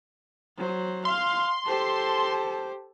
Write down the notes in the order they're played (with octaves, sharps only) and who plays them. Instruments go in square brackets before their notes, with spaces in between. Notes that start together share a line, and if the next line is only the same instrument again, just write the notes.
[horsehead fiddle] F#3 C5
[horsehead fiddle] F5 [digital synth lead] C6
[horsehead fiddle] G4 C5 [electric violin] A4 A5